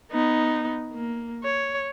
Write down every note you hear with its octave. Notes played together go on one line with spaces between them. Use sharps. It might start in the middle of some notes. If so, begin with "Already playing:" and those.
B3 D#4
A#3
C#5